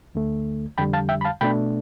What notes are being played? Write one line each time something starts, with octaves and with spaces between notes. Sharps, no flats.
D2 D3 A3
F2 D3 G3 G5 B5
F5 A5
E5 G5
B5
F5 A5
B2 A3 D4 G5 B5